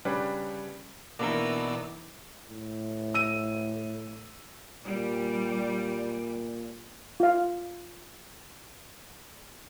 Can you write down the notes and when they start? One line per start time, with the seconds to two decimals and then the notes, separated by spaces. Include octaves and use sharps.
0.05 C#3 G3 D4 G4 B4 C#5
1.19 B2 E3 A#3 D4 D#4 A#4 D5 E6
2.49 A2
3.14 E6 D#7
4.84 A#2 G3
7.20 F4 F5